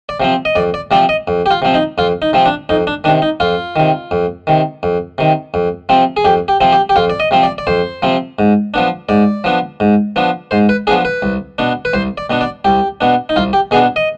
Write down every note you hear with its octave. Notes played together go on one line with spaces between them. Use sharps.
D5
C3 F3 C4
D#5
F2 D5
D5
C3 F3 C4 D5
D#5
F2
G4
F4
C3 F3 C4
D#4
F2 F4
D#4
C3 F3 C4
D4
F2 D#4
D4
C3 D#3 D4
D#4
F2 F4
C3 D#3
F2
C3 D#3
F2
C3 D#3
F2
C3 F3 C4
G#4
F2 G4
G4
C3 F3 C4
G4
G4
F2 F4
D5
D#5
C3 F3 C4
D5
D5
F2 C5
C3 F3 C4
G#2
F3 B3 D4
G#2 D5
F3 B3 D4
G#2
F3 B3 D4
G#2 C5
B4
F3 B3 D4 G#4
B4
C2
B2 B3 D4
B4
C2 C5
D5
B2 B3 D4
D5
C2 G4
B2 B3 D4
D#4
C2 F4
G4
B2 B3 D4 G#4
D#5